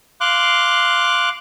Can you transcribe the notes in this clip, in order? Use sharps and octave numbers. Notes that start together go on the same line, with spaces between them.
F5 C6 D6 F#6